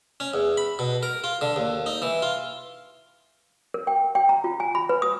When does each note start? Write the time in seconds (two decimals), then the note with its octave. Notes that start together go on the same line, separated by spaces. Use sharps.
0.20 C#4
0.34 E2
0.57 B5
0.79 B2
1.03 A#4
1.24 F4
1.41 D3
1.56 D#2
1.86 D#4
2.02 E3
2.22 F4
3.74 A#4
3.87 G5
4.15 G5
4.29 A#5
4.44 F4
4.60 G#5
4.75 B5
4.89 B4
5.02 D#6